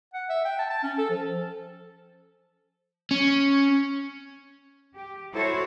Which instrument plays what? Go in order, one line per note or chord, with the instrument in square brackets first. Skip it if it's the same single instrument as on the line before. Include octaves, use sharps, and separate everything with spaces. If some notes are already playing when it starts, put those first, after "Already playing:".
[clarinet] F#5
E5
G5
A5
A5
C#4
A4
F3
[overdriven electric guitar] C#4
[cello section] G4
E4 F#4 A4 C5 C#5